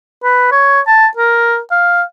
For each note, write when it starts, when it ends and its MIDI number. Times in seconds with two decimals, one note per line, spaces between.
0.23 0.50 71
0.52 0.80 73
0.87 1.07 81
1.17 1.59 70
1.71 2.03 77